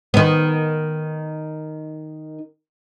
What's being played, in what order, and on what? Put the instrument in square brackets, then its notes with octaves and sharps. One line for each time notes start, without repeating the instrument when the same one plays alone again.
[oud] D#3 B3